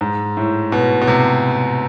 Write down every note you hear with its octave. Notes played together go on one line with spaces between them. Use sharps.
G#2
A2
B2
B2
C3